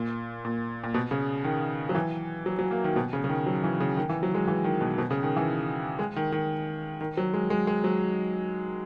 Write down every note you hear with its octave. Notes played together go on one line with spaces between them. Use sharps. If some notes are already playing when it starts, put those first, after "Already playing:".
Already playing: A#2
A#2
A#2
B2
C#3
D#3
F#3
E3
F#3
F#3
A#3
D#3
B2
C#3
C#3
D#3
F#3
E3
C#3
D#3
E3
F#3
G#3
E3
D#3
B2
B2
C#3
D#3
E3
G#3
D#3
D#3
D#3
F#3
G#3
G#3
G#3
F#3